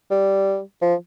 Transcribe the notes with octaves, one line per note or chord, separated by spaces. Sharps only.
G3
F3